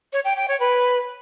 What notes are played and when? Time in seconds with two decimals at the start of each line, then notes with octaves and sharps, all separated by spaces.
0.13 C#5
0.25 G5
0.36 G5
0.48 C#5
0.60 B4